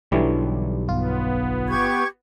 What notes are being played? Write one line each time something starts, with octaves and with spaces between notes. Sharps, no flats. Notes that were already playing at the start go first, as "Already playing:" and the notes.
B1 D3 E3 G3
G1 B3 F4
G4 C#6 G#6